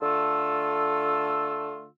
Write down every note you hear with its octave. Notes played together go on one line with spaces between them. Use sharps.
D3 A3 F4 A4 E6